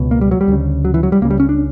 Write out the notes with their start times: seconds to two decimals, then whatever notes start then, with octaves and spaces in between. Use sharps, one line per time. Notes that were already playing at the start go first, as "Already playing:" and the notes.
Already playing: C#2 B2
0.11 A#3
0.21 G3
0.31 F#3
0.41 G3
0.48 D2 C#3
0.85 F#3
0.94 E3
1.03 F#3
1.12 G3
1.21 C#2 A#3
1.25 C#3
1.30 G3
1.40 C#4
1.49 D4